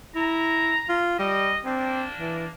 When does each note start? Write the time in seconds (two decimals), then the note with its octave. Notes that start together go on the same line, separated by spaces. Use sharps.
0.15 E4 A#5
0.89 F4
1.19 G3 D#5
1.65 A#3 C4 D4
2.18 E3